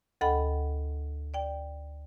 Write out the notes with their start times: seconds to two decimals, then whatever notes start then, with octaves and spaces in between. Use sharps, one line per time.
0.21 D2 A4 D#5 F#5 G5 B5
1.34 D5 G5